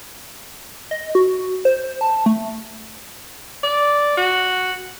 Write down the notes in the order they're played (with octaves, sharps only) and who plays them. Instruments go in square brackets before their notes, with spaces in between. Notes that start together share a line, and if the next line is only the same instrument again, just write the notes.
[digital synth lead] D#5
F#4
C5
A5
A3
[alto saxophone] D5
F#4